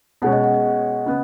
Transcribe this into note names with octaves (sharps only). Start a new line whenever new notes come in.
B2 G#3 C#4 F#5
D#5
F#5
D#5
C#3 B3